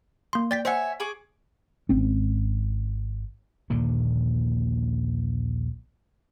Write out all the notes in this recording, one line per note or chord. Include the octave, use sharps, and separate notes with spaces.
A#3 C6
D5 G5 A6 B6
C5 C#5 E5 F#5 G#5
G#4 C#6 D6
G#1 C4 C#4
A#1 D#2 A#2 D3